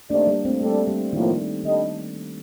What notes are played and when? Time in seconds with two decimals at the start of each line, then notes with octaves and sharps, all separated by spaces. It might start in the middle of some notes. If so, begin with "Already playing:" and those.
0.10 D#3 A3 A#3 C4 D4 G4 D5
0.27 G3 A#3
0.45 A3 C4
0.61 G3 A3 D4 A4
0.87 G3
1.13 A2 D#3 F3 A#3
1.30 D#3
1.64 D#3 G3 D4 A4 D#5